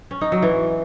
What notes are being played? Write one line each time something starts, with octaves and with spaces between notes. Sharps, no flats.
C#4
D#4
F#3
E3